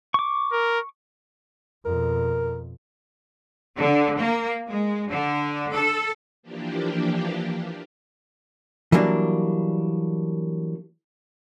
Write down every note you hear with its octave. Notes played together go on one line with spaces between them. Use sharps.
C#6 D6
A#4
F2 B2 A#4
D3
A#3
G#3
D3
A4
E3 F3 A#3 D4 G4
E3 F#3 G3 A#3 D4